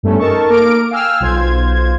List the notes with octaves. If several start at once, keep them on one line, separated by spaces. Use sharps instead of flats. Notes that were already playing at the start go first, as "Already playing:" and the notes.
G2 A3 B3 C#4 A4
D#4 A4 A#4 A5 C#6
A#3 A#4 D6 D7
F5 G5 G#5 E6 F6
B1 F4 C5 G#6